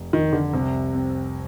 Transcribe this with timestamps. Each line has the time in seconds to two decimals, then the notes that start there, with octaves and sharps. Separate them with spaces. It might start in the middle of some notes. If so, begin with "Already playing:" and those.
Already playing: F1
0.13 F1 D#3
0.33 D3
0.53 C2 C3
0.93 C4